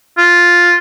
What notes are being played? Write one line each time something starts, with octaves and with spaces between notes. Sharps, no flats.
F4